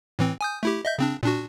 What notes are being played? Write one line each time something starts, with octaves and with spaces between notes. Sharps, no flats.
A2 E3 C4
G#5 D#6 G6
A3 E4 G4
D#5 E5 G6
C#3 C4 D4
A#2 D4 F#4